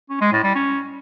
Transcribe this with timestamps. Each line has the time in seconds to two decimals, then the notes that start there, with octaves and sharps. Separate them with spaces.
0.10 C#4
0.21 G#3
0.32 A2
0.44 G3
0.55 C#4